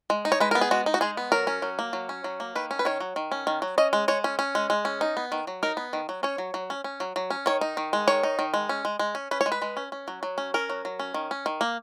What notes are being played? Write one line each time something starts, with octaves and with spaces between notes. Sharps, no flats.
G#3
D#4
C#5
G#3 B4
B3 A#4
G#4
G#3 F#4
D#4
F#4
G#3 G#4
B3
F#3 A#4
C#4
F#3
A#3
F#3
C#4
F#3
A#3
D#3 B4
C#4
B4
D#3 C#5
F#3
D#3
C#4
D#3
F#3
C#4 D#5
G#3
G#3 C#5
C#4
C#4
G#3
G#3
C#4
D#4
B3
D#3
F#3
D#4 A#4
B3
D#3
F#3
C#4 C#5
F#3
F#3
C#4
C#4
F#3
F#3
C#4
D#3 C#5
D#4
D#3
G#3
D#3 C#5
D#4
D#3
G#3
C#4
G#3
G#3
C#4
C#4 B4
C#5
G#3
B4
G#3
C#4
C#4
F#3
F#3
C#4
C#4 A#4
F#3
F#3
C#4
D#3
C#4
D#3
A#3